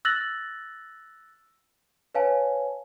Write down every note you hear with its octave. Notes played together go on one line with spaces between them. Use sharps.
E6 F#6 A6 A#6 F#7
B4 C#5 F5 G#5 A5